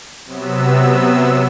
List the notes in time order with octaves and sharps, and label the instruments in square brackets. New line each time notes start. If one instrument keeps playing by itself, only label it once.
[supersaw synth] C3 F#3 B3 E6